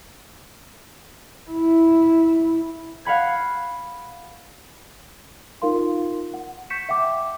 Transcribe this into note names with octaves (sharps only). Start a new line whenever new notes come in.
E4
F5 F#5 B5 G#6
D#4 F4 A#4 F5 C6
F#5
C#6 G6 B6 C#7 E7
E5 F#5 G5 D6